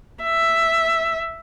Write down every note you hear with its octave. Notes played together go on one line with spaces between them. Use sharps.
E5